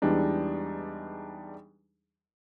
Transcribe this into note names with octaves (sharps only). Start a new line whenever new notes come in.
E2 E3 G3 G#3 D4 D#4